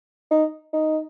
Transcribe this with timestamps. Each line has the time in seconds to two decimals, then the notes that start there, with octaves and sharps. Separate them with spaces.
0.31 D#4
0.73 D#4